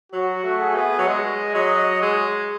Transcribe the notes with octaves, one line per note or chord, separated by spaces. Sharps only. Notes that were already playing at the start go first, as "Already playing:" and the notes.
F#3 F#4
A3
G#4
B3
F#3
G#3 D#5
F#3 D#5
G#3